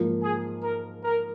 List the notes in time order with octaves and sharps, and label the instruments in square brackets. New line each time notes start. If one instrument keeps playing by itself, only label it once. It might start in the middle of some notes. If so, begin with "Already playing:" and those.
Already playing: [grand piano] G#2 F3 A#3
[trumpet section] G#4
A#4
A#4